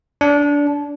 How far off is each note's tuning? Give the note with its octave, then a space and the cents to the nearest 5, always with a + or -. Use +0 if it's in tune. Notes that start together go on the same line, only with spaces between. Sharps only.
D4 -20